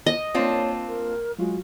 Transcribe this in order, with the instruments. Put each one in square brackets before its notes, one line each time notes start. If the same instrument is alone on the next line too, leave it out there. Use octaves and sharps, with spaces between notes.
[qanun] D#5
[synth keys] A#3 C5 [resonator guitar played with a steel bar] C4 D4 F4 [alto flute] C#5
[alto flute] A#4
[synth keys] F#3 F4 F#4 [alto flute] G#3